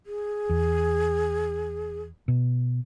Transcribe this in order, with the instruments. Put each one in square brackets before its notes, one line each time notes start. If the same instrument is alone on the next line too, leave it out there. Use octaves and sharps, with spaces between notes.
[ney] G#4
[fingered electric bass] E2
B2